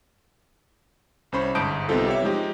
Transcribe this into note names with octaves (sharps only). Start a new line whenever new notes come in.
C2 C#4 C5 B5 C#6
G1 G#2 A5 D#6 G6 D7
C2 B3 C4 D#4 F4 A4
G4 C#5 E5
F3 G#3 D#4 G4